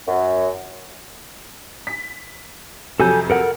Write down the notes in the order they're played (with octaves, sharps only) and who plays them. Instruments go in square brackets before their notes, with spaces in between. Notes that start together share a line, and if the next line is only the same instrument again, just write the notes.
[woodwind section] F#2
[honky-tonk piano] B6
[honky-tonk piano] F2 C3 F#3 [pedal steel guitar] A4 G#5 G6
[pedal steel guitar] A4 A#4 F#5